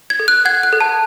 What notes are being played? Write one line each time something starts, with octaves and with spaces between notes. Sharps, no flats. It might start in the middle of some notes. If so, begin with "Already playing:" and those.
G#6
A4
F#6
F#5 G#6
F#6
A4
A5